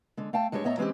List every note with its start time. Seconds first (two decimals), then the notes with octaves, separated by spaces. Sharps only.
0.17 D3 G#3
0.33 A3 F5 G5 A5
0.52 G2 G3 G#3 D4 E4 C#5
0.64 A2 B3 C#5 D#5 E5 A#5
0.78 E3 G#3 C4 C#4 G4